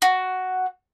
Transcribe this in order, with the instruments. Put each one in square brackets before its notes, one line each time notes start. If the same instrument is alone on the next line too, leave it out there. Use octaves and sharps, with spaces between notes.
[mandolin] F#4